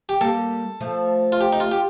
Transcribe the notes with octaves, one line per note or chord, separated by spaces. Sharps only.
G4
G3 A#3 A4
F3 A3
F4
G4
D#4
F4
G4